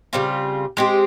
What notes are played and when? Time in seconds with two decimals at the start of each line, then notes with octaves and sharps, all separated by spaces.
0.13 C#3 G3 C4 F4
0.77 G#3 C4 G4